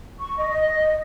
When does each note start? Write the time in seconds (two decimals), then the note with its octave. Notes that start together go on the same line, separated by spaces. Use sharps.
0.20 C#6
0.37 D#5
0.50 D#5
0.75 D#5